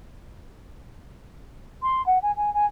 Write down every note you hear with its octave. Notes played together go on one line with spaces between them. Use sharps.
C6
F#5
G#5
G#5
G#5